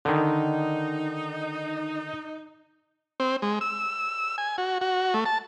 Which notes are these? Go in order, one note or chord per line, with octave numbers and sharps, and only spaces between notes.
D3 D#3 D#4
C4
G#3
E6
G#5
F#4
F#4
A3
A5